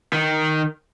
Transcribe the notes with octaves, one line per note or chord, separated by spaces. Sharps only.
D#3